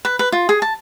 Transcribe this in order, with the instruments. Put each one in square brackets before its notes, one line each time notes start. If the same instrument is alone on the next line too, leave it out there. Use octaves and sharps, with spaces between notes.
[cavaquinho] B4
B4
F4
G#4
A5